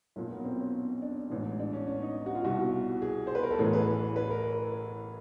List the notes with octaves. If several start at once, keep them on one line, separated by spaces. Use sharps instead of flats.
B1 A#2 A#3
B3
C4
C#4
D4
A1 G#2 E3
D4
C#4
C#4
D#4
F#4
F4
C2 B2 F#4
G#4
C5
B4
A#4
A4
A1 A2 E3 G#4
B4
B4
A#4